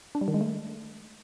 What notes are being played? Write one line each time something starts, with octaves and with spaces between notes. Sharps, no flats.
D4
G3
D#3
G#3
A3